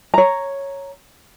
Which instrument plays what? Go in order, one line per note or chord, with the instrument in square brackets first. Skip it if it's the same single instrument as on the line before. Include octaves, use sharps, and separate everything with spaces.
[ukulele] C#5 A#5